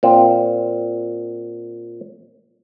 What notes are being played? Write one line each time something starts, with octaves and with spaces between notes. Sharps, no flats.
A#2 C4